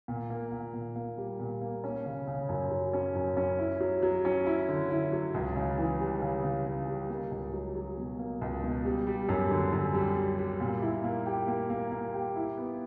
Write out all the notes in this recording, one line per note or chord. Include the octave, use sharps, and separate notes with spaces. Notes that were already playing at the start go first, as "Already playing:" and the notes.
A#2
A#3
A#2
A#2
A#3
G3
A#2
A#3
C#4
C#3
C#3
F#2
F#3
C#4
F#2
C#4
E4
F#3
F#3
C#4
E4
D3
E4
F#3
C#2
C#3
E3
G3
C#3
C#3
C#3
G3
A#3
C#2
F#3
F#3
B2
A#3
C#2
B2
G3
G3
F#2
D3
F#2
G3
G3
G3
A#2
E4
A#3
G4
A#3
A#3
A#3
G4
E4
B3